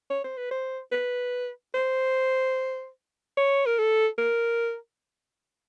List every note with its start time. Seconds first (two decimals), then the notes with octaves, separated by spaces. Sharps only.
0.10 C#5
0.24 C5
0.37 B4
0.51 C5
0.92 B4
1.74 C5
3.37 C#5
3.66 A#4
3.79 A4
4.18 A#4